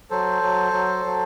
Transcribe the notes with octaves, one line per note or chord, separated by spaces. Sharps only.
F#3 A4 C5
F#3
F#3
F#3